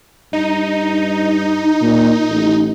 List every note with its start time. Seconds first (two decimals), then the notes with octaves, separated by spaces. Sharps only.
0.33 G2 D#4
1.82 A#2
2.29 A1